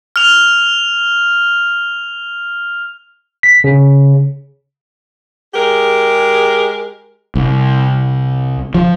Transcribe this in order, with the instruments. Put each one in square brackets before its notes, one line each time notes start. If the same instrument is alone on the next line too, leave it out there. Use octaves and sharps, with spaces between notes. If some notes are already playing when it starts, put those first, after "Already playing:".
[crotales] F6 F7
[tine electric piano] B6
C#3
[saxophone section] G#3 G4 G#4 A#4
[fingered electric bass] C2
F3